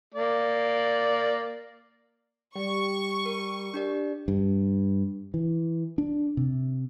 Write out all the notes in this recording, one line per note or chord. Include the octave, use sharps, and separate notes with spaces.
A#3 D5
G3 C#6
A#4
D4 G4 D5
G2
E3
D4
C3